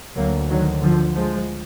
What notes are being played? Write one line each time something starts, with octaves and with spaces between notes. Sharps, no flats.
D2 F#3 A#3
D#3 F#3
D3 F3
F3 G#3